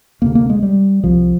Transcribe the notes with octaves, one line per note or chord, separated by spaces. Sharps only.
D2 C3 A#3
A#3
G#3
G3
C2 C3 F3